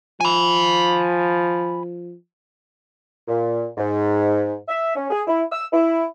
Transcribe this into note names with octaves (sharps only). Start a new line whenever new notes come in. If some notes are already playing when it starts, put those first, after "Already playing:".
F3 G#5 B5
A#2
G#2
E5
C#4
G#4
E4
E6
E4